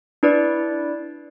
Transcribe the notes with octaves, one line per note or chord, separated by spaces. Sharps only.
D4 E4 B4 D5